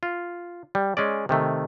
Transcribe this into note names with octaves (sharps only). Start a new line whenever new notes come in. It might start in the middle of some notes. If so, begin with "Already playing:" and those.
F4
G3
G#3 C#4 D5
C3 D#3 A3